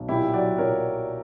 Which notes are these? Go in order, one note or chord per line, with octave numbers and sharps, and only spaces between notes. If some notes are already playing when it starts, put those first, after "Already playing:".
Already playing: B1
A#2 E4 G4
F#3 D5 F#5
A#2 A#4 C#5